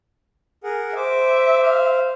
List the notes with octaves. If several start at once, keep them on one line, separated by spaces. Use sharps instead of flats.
G#4 A#4 F#5
C5 E5 D6
C5 F5